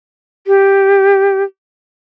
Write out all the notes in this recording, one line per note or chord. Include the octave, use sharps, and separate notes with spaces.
G4